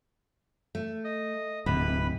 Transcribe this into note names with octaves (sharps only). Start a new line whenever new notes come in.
A3
D#5
D1 G#2 C3 B4 B5